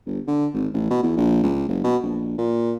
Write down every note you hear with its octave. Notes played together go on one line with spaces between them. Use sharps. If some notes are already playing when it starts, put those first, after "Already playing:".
G1
D3
G#1
A1
B2
E2
A#1
C#2
F#1
B2
A#1
A#2